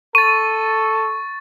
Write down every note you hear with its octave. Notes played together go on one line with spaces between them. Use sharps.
A4 C#6 A6 D#7